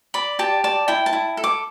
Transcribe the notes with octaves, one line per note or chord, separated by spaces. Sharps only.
D5 B5
G4 A5
D5 A5
E4 G5
A5
E4
A4
D6